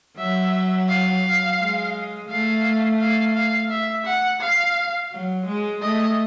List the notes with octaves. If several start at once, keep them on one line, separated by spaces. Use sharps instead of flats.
F#3 E5
F5
G#3
A3 F5
F5
F5
E5
F#5
F5
F#3
G#3
A3 D#5